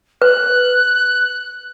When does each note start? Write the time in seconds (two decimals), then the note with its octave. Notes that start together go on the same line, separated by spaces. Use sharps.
0.22 B4 F#6